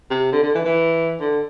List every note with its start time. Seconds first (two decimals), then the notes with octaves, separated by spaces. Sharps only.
0.10 C3
0.32 D3
0.43 D3
0.55 E3
0.65 E3
1.20 D3